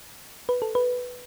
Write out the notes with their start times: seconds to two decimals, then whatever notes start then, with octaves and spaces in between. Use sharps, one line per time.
0.49 B4
0.62 A4
0.75 B4